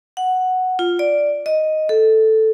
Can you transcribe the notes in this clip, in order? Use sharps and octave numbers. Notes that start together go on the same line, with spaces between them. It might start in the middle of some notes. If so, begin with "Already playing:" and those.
F#5
F4
D5
D#5
A4